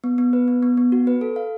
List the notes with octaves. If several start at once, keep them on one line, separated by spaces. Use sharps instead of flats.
B3
B3
B4
B3
B3
B3
F#4
B4
A4
F5